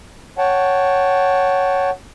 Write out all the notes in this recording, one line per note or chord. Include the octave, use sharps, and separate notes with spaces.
C#5 F#5 G5 A5